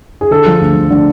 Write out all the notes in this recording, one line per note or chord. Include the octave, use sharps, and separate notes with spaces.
G#4
D3 A4
F3
D2
D3
D3